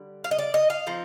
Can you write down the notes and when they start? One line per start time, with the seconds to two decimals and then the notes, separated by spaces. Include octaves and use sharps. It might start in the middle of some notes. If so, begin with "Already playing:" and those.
Already playing: D3 G3
0.24 F5
0.31 D#5
0.39 D5
0.54 D#5
0.70 F5
0.87 F3 C4 D#4